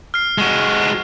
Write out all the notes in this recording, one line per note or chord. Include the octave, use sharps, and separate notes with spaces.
F6 C7
G#3 F#4